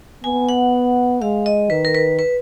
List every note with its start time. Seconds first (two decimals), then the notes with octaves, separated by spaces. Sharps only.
0.24 B3 G#5
0.49 F#5
1.22 G#3 F5
1.46 D#5
1.70 D#3 B4
1.85 A#4
1.95 B4
2.19 B4